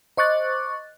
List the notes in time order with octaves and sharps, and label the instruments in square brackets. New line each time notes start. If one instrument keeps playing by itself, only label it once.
[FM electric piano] C5 D#5 C#6 D6 F#6 A6